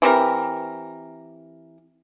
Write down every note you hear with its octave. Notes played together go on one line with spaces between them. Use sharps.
E3 C4 G4 A#4